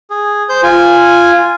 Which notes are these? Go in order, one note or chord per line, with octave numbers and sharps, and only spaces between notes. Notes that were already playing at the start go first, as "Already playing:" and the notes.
G#4
C5 G6
F4 G#5